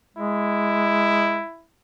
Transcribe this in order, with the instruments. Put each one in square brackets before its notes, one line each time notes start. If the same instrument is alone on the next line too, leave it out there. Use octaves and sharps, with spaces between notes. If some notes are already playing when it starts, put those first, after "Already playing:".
[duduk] G#3 [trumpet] E4